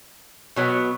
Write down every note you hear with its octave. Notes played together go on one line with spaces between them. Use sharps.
B2 F#3 B3